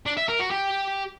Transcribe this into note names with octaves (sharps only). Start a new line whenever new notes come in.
D4
E5
A#4
F#4
G4